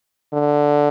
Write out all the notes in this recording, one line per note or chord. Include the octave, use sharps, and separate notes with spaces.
D3